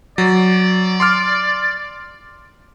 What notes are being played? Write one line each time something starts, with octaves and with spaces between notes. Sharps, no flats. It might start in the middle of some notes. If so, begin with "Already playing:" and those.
F#3 D5
C6 D6 F6